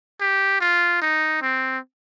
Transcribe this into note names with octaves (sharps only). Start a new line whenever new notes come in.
G4
F4
D#4
C4